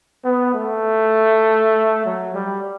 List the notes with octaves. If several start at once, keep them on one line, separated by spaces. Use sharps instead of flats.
B3
A3
F#3
G3